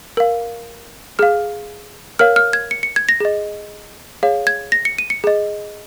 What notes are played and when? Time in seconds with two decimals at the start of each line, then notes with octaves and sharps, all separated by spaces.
0.17 A#4 F5
1.19 G#4 F5 F6
2.19 A#4 C#5 F5 F6
2.36 F6
2.53 G#6
2.71 C#7
2.83 C#7
2.96 G#6
3.09 A#6
3.20 G#4 D#5
4.23 G#4 C#5 F5
4.47 G#6
4.72 A#6
4.85 C#7
4.98 D#7
5.10 C#7
5.24 G#4 D#5